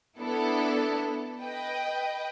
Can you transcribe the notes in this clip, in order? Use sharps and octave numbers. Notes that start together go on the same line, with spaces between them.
B3 D4 E4 A4
B4 D#5 G5